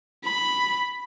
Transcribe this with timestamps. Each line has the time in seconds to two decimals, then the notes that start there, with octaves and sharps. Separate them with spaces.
0.24 B5